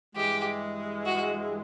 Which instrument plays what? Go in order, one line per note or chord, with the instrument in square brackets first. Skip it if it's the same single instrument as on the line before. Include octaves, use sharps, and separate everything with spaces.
[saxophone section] G2 E3 G#3 [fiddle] G4
[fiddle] F#4